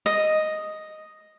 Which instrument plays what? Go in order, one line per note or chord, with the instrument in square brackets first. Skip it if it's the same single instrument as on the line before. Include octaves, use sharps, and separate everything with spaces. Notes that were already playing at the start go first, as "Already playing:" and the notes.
[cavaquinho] D#5